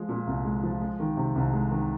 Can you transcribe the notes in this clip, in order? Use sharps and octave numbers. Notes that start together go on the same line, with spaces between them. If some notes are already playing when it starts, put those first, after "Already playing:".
Already playing: F3 G#3
A#2
C2
G#3
F3
G#3
D#3
C3
C2
G#3
D#3